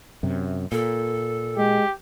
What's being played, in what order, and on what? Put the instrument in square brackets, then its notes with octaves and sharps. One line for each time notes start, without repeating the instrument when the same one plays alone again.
[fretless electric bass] F#2 C3
[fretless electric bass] A#2 [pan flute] A4
[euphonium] G#3 [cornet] G4